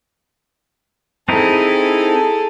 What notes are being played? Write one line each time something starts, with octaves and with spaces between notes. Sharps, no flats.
C4 D#4 E4 G#4 A4